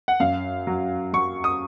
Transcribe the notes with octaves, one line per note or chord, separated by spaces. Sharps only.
F#5
F#2 F5
F#3
F#3 C#6
D#6